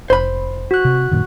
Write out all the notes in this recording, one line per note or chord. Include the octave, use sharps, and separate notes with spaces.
F1 C5 B5
F#4 F#6
C3
F#2 A#2 D#3